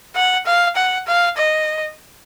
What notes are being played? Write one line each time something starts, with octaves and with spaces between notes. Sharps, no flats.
F#5
F5
F#5
F5
D#5